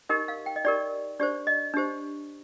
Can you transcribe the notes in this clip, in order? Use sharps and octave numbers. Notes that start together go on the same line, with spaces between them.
D#4 G4 A#4 D#5
F5
G5
D#5
D#4 G4 A#4 D5
D4 G4 C5 D5
D#5
D4 G4 C5